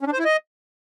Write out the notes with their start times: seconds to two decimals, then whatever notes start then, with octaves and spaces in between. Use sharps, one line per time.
0.01 C#4
0.07 D4
0.13 C5
0.19 E4
0.25 D#5